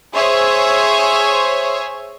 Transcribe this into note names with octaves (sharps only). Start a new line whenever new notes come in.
G#4 C5 C#5 E5